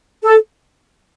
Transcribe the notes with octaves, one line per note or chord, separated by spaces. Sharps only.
A4